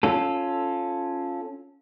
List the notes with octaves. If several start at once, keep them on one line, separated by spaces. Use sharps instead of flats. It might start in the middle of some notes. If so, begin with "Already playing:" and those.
C#4 F4 A4